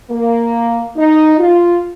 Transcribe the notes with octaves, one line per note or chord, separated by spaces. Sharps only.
A#3
D#4
F4